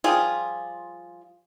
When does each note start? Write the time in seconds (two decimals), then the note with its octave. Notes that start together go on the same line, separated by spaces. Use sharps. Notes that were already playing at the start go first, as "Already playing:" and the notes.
0.04 F3 G3 F4 G#4